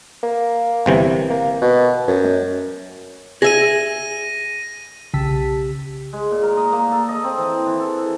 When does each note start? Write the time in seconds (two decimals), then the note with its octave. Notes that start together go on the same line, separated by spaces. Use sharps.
0.23 A#3
0.86 G1 C3 E3
1.30 A#3
1.61 B2
2.08 F#2
3.42 G#4 E5 A#6 D#7
5.14 B1 C#3 G4 A5 E6 B6
6.13 G#3
6.31 A#2
6.43 A#4
6.57 D#5
6.72 A#3
6.92 A4
7.09 D#5
7.24 C4
7.37 E3
7.66 E3
7.80 A4
7.97 A4